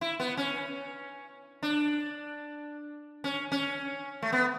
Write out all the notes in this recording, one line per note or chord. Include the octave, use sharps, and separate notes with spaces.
E4
B3
C#4
D4
C#4
C#4
A3
B3